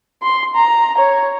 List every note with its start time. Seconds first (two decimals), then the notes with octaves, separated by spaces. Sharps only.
0.22 C6
0.55 A#5
0.98 C#5